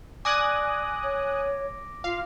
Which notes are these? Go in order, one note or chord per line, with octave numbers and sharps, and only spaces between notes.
D5 G#5 D6 D#6 F#6 A#6 D7
C#5
F4 F5